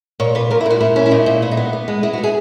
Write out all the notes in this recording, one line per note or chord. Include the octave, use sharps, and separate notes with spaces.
A#2 C#5
A#2 B4
A#2 A#4
E4
A#2 F#4
A#2 E4
C#4 E4
E4
A#2 D#4
A#2 E4
B3 E4
D#4
B3
B3
G#3
G#3 E4
F#4
B3
G#4